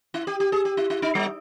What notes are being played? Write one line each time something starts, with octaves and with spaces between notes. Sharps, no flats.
E4
G4
G4
G#4
G4
E4
E4
D#4
G3